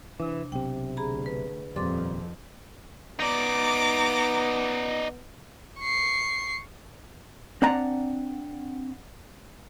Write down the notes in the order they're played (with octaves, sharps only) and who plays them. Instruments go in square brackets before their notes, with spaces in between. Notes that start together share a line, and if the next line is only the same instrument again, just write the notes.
[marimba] C3 D4 [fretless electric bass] E3
[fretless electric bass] B1 C3 [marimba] G5
[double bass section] D2 [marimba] G#4 A#5 B5
[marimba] B4
[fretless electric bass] D#1 G3 [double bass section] F2 [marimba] C6 D6 A6
[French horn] B3 [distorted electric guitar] D#4 D5 [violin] A#5 D6
[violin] C#6 C7
[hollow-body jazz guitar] C4 D4 D5 F#5 A#5